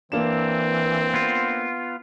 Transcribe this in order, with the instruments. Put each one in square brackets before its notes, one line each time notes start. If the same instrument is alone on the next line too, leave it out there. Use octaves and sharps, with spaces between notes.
[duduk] E3 [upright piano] A#3 D4 E7 [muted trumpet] C4
[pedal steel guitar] B3 F4